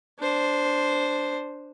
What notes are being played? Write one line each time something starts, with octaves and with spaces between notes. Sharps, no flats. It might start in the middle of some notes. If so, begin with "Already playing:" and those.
D4 C5